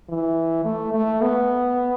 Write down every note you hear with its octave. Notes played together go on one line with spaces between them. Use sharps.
E3
A3
A3
B3